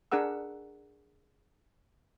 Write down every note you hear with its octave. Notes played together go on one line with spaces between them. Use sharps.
D4 G#4 A#4 F#5 E6